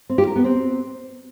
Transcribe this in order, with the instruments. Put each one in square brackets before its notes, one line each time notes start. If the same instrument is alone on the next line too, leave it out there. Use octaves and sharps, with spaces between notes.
[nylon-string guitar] C4
G4
A#4
B3
C4